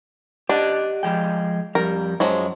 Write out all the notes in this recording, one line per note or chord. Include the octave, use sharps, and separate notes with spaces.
D4 G4 D#5 F#5
F3 G#3 G5
F2 G3 A#4
F#2 F3 F#3 G#3